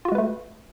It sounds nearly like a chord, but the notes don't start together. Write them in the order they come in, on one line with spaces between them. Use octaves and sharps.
F4 F#4 G#3 B4 A3